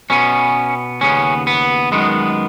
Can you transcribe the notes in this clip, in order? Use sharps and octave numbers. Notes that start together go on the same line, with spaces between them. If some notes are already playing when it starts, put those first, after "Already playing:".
B2 B3 C#4
D#2 C#3 B3 C#4
B3
F#2 D#3 G#3 B3